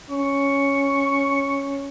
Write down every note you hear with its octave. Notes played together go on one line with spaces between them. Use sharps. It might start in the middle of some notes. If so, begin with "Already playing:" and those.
C#4 C#6